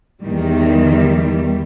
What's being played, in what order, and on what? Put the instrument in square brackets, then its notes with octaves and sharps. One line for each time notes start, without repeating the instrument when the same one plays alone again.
[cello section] E2 D#3 G3